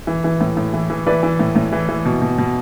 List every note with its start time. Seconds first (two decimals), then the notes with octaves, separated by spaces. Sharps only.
0.07 E3
0.24 E3
0.41 A2
0.57 A2
0.74 E3
0.90 E3
1.06 E3 B4 D5
1.23 E3
1.39 A2
1.56 A2
1.72 E3
1.89 E3
2.05 B2
2.22 B2
2.38 B2